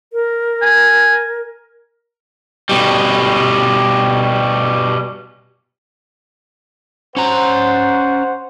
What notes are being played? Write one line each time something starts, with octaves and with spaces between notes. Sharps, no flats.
A#4
G#5
B2 G3
C#4 C5 F#5 A#5